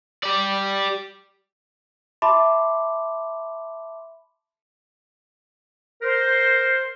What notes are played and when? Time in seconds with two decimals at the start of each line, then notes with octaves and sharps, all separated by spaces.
0.23 G4 D5
2.22 E5 A5 B5 C6 D6
6.01 A#4 C5